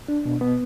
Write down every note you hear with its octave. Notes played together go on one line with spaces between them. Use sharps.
D4
B2
B3